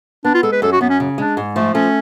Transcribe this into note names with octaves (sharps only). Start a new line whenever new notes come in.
B3 D4
F4
G#3 A4
B4
F#2 A4
F#4
F#2 B3
C#4
C#3
G#3 D4
G#2
F3 A3
A3 C#4